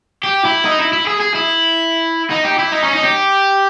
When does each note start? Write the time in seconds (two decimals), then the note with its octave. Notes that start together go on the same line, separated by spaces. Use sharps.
0.24 G4
0.45 E4
0.65 D#4
0.79 E4
0.93 E4
1.07 G#4
1.21 G#4
1.35 E4
2.31 D#4
2.45 G4
2.59 E4
2.72 D#4
2.83 C#4
2.93 D#4
3.03 G4